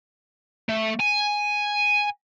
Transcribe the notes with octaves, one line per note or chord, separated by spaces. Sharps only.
A3
G#5